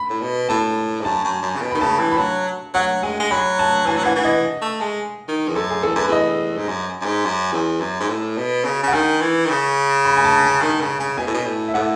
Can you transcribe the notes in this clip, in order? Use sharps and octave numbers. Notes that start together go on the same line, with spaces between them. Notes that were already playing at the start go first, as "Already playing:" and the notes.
Already playing: B5
A2
B2
A2 A5
G#2
F#2 A5
F#2
F#2
C#3
B2
D#3 B5
C#3 A5
B5
E3
B5
F#3 A5
F#3 F#5
G#3 G#5
G#3
F#3 B5
A5
E3 G#5
F#3
E3 F#5
E3
D#5
A3
G#3
D#3
E2
F#2 A4
G#4
E2 A4
F#2 B4
E2 D#5
G#2
F#2
F#2
G#2
F#2
E2
F#2
G#2
A2
B2
C#3
C#3 F#5
D#3 G#5
E3
D#3
C#3
B5
G#5
A5
A5
D#3
C#3
C#3
B2 G#5
A2
B2
A2
E5
A2 F#5